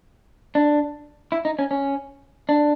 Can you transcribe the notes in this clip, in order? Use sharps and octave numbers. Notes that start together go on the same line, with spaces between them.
D4
E4
D#4
C#4
C#4
D4